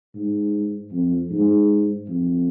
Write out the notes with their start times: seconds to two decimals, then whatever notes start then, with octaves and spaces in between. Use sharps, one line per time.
0.15 G#2
0.92 F2
1.31 G#2
2.09 F2